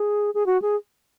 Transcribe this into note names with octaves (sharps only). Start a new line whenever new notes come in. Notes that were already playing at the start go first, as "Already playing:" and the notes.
Already playing: G#4
G#4
F#4
G#4